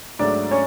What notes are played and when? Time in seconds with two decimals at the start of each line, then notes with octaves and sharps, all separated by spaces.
0.19 G#2 F#3 A3 D4 D5
0.51 C#4 C#5